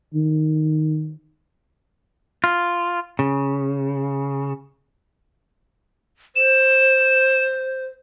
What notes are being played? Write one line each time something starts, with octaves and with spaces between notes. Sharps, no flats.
D#3
F4
C#3
C5 E7